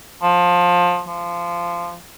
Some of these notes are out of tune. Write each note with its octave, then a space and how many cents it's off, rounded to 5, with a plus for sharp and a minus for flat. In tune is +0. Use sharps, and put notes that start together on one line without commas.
F3 +20
F3 -15